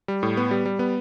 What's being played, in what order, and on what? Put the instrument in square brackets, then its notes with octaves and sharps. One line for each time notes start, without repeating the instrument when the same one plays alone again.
[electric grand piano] G3
A2
B3
G3
G3
B3